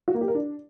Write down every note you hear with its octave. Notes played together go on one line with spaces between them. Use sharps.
F#4
A#3
G4
A#4
D4